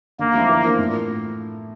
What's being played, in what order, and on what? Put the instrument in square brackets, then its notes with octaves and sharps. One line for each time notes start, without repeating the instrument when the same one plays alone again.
[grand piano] D3 [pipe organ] A#3
[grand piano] F3 A3 C4 E4
E3
A#3 D4 F4 A#4
A2